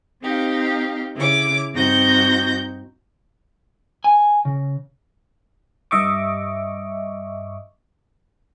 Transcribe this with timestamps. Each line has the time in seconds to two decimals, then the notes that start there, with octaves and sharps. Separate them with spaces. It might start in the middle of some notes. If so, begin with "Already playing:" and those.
0.22 C4 D#4 G4 F5
1.16 C#3 E4 C#5 D6
1.74 G2 C4 D#4 F#4 G6 A#6
4.04 G#5
4.45 C#3
5.91 G2 D#5 E5 C#6 D6